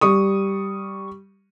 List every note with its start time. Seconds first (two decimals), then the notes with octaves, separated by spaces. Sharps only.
0.01 G3 C#6 D#6